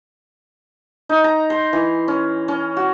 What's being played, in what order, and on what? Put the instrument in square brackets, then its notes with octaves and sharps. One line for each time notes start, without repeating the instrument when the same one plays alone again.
[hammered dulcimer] D#4
A#5
C6
E3
C#4
C#4
F#4